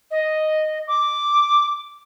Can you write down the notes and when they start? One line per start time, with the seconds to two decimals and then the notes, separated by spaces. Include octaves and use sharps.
0.11 D#5
0.88 D6